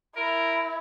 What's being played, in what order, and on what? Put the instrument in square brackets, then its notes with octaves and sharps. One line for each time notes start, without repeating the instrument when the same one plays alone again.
[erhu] E4 [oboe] A#4